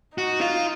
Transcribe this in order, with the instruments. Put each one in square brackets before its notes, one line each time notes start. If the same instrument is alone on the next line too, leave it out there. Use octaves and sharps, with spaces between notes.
[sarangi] D#4 [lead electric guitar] F#4
[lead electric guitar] F4